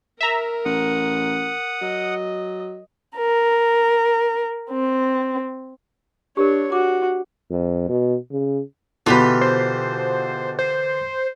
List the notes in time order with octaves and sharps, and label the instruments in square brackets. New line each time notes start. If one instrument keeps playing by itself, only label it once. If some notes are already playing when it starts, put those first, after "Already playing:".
[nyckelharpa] A#4 [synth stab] E5 A#5
[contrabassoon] A1 [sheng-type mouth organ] F#5 D#6
[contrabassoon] F#3 [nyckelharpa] D#5
[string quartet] A#4
C4
[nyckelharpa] D4 C#5 [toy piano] G4 A#4
[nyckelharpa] F#4 [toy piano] D6
[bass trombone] F2
B2
C#3
[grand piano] B2 [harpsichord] D3 E3 [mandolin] F4 G4 B5
[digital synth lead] C5
C5